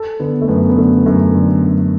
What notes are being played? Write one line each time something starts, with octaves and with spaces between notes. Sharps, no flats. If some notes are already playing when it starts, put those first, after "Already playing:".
Already playing: A4
D3 B3
A3
F#2 B3
B3
D3 A3
F#2 A3
D3
F#2